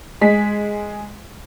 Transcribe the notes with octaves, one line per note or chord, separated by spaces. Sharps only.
G#3 G#4 B6